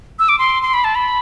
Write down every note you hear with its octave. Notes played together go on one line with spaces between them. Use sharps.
E6
D6
C6
C6
B5
A5
B5